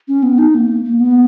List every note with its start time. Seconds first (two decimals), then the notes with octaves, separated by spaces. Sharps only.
0.08 C#4
0.23 B3
0.38 D#4
0.55 B3
0.58 A#3
0.85 A#3
1.00 B3